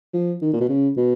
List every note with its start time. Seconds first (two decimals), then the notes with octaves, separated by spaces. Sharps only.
0.14 F3
0.41 D#3
0.53 A#2
0.61 B2
0.69 C#3
0.97 B2